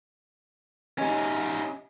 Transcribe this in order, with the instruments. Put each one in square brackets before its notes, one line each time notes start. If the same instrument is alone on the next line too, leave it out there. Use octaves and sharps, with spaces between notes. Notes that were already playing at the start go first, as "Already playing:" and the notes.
[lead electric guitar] C#4 D#4 [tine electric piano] G4 D#5 G#5